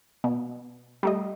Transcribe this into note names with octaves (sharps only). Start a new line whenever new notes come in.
B2
G3 A3 D#5